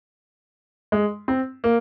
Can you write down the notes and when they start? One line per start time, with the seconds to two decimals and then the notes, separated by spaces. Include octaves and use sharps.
0.92 G#3
1.28 C4
1.64 A#3